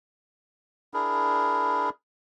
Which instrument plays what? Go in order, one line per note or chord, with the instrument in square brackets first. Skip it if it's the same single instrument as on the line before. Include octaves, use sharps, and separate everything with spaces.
[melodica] D4 E4 G#4 A#4